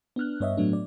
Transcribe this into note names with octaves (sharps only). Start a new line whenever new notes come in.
B3 D4 F6 F#6
G2 B3 C#5 D#5 E5
A2 F#3 A3 B3 D4
D5